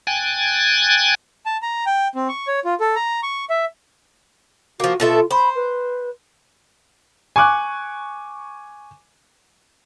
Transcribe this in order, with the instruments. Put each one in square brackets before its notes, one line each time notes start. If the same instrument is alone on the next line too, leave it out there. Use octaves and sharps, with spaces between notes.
[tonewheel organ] G5 G#5 F#6 G#6 A6
[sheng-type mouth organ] A5
A#5
G5
C4
C#6
C#5
F4
A4
A#5
C#6
E5
[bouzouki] F3 A#3 [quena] F#4
[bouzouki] B2 A4 E5 [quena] F4
[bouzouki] C5 [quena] B5
[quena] B4
[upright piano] G#5 C#6 D6 F#6